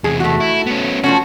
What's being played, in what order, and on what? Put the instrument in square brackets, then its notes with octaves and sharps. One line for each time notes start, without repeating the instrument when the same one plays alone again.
[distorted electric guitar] E2 C3 [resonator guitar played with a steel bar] G#4
[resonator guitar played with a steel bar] A3 F#4
[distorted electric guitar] E4
B3 C#4
[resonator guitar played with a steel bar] F3 A3 C#4 [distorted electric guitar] F#4